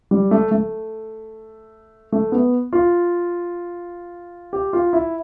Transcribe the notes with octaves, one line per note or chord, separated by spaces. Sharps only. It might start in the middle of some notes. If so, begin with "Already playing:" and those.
G3
A3
A3
A3
B3
F4
G4
F4
E4